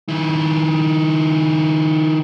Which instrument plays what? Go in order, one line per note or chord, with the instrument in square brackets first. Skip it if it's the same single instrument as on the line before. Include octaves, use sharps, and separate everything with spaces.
[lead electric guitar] D#3 E4